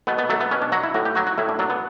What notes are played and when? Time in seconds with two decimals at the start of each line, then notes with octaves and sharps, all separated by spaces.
0.07 B2 B3
0.18 B3
0.29 F#3 A3
0.40 B3
0.51 B2 C#4
0.62 D4
0.72 F#3 F#4
0.83 E4
0.94 A2 F#4
1.05 G4
1.15 F#3 F#4
1.27 F#4
1.38 A2 E4
1.49 D4
1.59 F#3 D4
1.70 B3